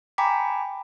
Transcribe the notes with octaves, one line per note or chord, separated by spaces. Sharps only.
G5 G#5 A#5 B5 D6 B6